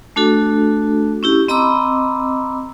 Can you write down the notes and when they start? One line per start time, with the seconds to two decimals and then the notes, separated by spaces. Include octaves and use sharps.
0.16 A3 D4 F#4 A4
1.23 C#4 E4 G4
1.48 C4 D#5 A#5 B5 D6 E6